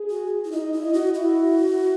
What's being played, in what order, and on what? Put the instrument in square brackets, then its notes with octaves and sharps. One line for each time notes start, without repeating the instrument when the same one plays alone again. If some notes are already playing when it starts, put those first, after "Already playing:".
Already playing: [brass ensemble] G#4
[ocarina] F#4
E4
[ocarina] D#4 [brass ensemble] D#5
[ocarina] E4
[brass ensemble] D#5
[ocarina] F#4
[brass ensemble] E4 [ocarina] F#4